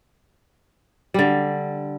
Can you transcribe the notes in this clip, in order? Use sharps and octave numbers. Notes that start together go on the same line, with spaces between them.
D3 G3